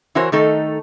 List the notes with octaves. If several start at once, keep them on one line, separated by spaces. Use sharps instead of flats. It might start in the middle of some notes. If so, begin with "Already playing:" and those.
E3 E4 F#4 A#4 C5 C#5
D#3 A3 D#4 A4